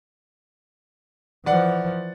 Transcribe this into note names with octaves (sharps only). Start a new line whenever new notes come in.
E3 F3 D5 F#5